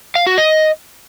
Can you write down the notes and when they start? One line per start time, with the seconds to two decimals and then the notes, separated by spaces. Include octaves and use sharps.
0.15 F5
0.27 F#4
0.38 D#5